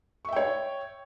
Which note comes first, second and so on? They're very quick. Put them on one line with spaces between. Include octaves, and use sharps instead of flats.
C#6 E5 G5 C#5